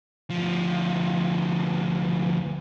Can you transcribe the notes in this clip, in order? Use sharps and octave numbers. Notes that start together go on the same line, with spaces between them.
D2 F3